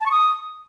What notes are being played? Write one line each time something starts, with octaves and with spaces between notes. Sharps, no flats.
A5
C#6
D#6